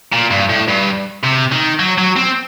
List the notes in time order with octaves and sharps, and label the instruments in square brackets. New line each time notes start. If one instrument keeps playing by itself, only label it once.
[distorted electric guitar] A#2
G2
A2
G2
C3
D#3
F#3
F#3
C4